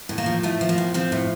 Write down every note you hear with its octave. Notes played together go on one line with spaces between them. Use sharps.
A2
A#3
F3
A2 A3
F3
A#3
A2
F3 C4
A2